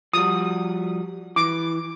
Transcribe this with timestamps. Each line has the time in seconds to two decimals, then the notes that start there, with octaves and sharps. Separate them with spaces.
0.14 F3 G3 F#4 D#6
1.36 E3 D6